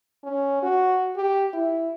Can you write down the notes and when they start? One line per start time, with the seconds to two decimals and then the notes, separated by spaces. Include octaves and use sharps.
0.24 C#4
0.62 F#4
1.16 G4
1.54 E4